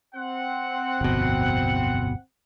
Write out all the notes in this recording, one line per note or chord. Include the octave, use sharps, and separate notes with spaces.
C4 F#5
D1 G1 F2 B2